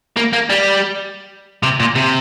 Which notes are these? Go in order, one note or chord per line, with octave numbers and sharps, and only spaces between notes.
A#3
A#3
G3
C3
A#2
C3